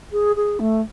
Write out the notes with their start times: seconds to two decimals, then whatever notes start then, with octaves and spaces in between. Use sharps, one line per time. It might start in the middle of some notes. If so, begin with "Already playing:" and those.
0.12 G#4
0.36 G#4
0.59 A3